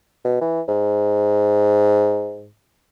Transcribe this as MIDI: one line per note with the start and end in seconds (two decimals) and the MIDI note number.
0.24 0.38 47
0.41 0.61 52
0.68 2.50 44